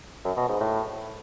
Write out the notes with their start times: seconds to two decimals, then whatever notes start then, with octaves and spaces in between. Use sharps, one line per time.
0.25 F#2
0.37 B2
0.48 G#2
0.60 A2